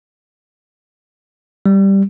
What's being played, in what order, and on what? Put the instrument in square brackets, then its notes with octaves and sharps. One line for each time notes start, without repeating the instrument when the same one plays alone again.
[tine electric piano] G3